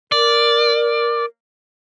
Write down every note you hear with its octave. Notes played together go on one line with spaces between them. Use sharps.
A#4 D5